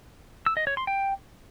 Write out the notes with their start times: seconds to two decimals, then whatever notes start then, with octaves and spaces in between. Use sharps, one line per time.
0.46 E6
0.57 D#5
0.67 C#5
0.77 C6
0.87 G5